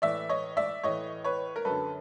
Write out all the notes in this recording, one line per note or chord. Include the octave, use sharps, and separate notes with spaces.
A2 E3 D5 E5
C#5 D#5
D5 E5
A2 E3 C#5 D#5
B4 C#5
A#4
F#2 D3 A4 B4